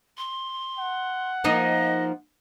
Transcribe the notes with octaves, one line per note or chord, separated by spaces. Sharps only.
C6
F#5
F3 A#3 D#4 D#5